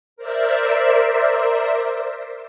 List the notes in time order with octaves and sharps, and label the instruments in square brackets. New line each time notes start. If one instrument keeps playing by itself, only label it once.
[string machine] A#4 C5 D5 E5